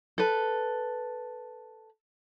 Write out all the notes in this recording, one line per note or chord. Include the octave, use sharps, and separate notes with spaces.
A4 B4